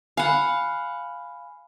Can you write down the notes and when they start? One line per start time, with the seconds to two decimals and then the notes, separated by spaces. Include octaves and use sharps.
0.17 F5 F#5 G#5 B5